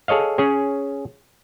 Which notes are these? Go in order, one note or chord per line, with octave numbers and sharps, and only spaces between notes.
G#4 A4 C#5 D#5 F5
C#4 G#4 C#5